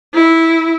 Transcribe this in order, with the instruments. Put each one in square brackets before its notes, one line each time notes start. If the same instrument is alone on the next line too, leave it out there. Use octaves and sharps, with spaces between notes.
[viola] E4